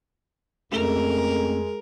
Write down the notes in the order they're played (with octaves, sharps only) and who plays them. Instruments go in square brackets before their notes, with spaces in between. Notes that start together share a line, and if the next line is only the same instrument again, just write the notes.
[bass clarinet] F2 [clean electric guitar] C#3 A3 [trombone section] G#3 [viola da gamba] A#4